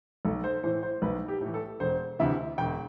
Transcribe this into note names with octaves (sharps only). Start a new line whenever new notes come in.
B1 A4
C5
A2 E3 C5
C5
B1 B4
G4
A2
E3
A4
E1 C5
D2 C3 E3 E5
E1 G5